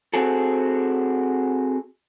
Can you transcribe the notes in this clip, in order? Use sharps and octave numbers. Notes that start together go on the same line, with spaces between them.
C4 F#4 G#4 A4